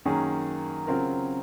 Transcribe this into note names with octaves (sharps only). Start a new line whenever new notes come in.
F#2 D#3 A#3 C#4 G#4
C#3 F#3 C4 F4 A#4